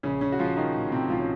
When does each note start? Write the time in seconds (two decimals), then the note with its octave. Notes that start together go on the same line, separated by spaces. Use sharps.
0.03 A#1 C#3 C#4
0.21 C#3 C#4
0.32 F#4
0.39 A#1 F3 F4
0.57 D#3 D#4
0.75 A2
0.92 C3 C4
1.10 A#1 F3 F4
1.20 C#4